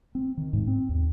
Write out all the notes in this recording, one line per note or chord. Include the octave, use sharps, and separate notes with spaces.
C4
D#3
G#2
C4
D#2